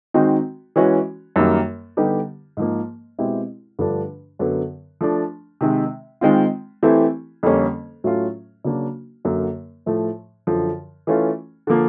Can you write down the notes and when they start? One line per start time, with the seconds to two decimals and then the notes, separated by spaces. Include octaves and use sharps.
0.14 D#3 G#3 C4 D#4 F#4
0.76 E3 G#3 C#4 F#4
1.36 F#2 D#3 G3 A#3
1.97 D3 G3 B3 D#4 G4
2.57 G#2 F3 A#3
3.18 B2 G#3 C4 E4 G4
3.79 G2 D3 F3 A3 D4
4.39 F#2 D3 F#3 B3
5.01 F3 A3 D4
5.61 C3 D#3 G#3
6.21 D#3 G#3 C4 F4
6.83 E3 A3 C4 E4 G4
7.43 F2 D3 G3 A#3 C#4
8.04 A2 F#3 A3 C#4 F4
8.65 C#3 F#3 A#3 D4 F#4
9.25 F#2 D3 F#3 A#3
9.86 A2 F3 A3
10.47 F#2 D3 F3
11.07 E3 A3 C#4 F4
11.67 D3 F3 A#3